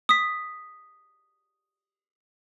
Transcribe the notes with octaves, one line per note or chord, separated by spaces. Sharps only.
D#6 B6